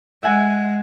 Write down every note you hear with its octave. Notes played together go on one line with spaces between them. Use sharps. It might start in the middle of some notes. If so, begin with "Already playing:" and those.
G#3 E5 F#5 G#5